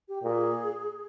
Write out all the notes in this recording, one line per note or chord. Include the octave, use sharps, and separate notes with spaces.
G4
A#2 G#4